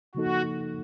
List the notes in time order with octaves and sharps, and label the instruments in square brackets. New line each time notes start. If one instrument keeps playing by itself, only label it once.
[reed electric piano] C#3 F3 A#3 D#4 A4 [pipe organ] F#4